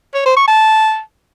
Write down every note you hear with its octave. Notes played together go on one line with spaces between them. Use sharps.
C#5
C5
C#6
A5